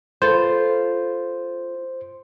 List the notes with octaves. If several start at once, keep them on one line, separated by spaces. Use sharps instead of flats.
F4 A4 B4 C5